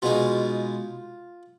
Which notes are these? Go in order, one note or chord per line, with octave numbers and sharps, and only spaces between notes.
B2 G#3 D#4 F4